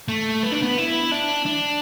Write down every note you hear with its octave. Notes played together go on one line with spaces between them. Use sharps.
A3
B3
D4
B3
E4
D4
D4